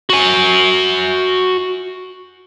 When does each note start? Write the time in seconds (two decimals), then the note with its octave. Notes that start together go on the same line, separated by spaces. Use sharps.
0.10 F#4 G#5